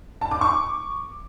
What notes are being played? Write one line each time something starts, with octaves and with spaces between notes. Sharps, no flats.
A5
D6
C#6